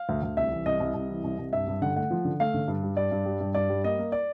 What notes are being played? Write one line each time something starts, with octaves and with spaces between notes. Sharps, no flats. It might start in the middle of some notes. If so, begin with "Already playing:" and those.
Already playing: F5
D2
D2
C2 E5
E3
C2 D#5
C2
C2
E3
C2
C2
G2 E5
G2
D3 F#5
A3 F#5
F3
D3
A3 F5
D3
G2
G3
G2 D5
G2
G3
G2
G2 D5
G3
A#3 D#5
A#3
D5